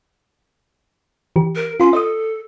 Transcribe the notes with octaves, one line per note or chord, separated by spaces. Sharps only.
E3 G4
A#4
C#4 F4 C6
A4 D#5 D#6